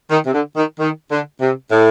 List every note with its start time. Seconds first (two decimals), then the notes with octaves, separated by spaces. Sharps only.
0.10 D#3
0.26 C3
0.33 D3
0.56 D#3
0.79 D#3
1.10 D3
1.40 C3
1.71 A2